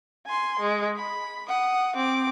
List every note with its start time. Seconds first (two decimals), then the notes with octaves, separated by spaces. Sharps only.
0.26 G#5 C6
0.59 G#3
0.96 B5
1.48 F#5 D#6
1.96 C4 D6